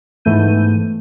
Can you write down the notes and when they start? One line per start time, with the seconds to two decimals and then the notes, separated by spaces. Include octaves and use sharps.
0.25 G#2 E3 A3 B3 G6 D#7